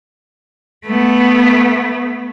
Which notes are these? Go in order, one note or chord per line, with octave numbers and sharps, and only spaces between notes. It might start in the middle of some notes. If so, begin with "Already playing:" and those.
A3 B3